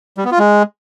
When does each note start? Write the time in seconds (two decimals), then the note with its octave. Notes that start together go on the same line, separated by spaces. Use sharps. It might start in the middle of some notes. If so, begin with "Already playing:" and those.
0.17 G3
0.25 B3
0.32 F4
0.39 G#3